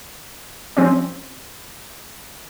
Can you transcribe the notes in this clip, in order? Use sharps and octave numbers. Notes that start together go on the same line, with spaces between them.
F3 C4 C#4